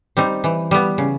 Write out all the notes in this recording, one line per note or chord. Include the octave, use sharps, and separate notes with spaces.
G3 C4 D#4
E3
G3 B3
C#3